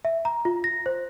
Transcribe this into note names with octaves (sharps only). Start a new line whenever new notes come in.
E5
A#5
F4
A#6
C5